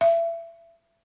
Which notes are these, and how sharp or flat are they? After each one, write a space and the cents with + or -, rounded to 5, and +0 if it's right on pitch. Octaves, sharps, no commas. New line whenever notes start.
E5 +25